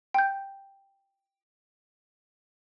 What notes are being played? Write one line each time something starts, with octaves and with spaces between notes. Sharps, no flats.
G5 G6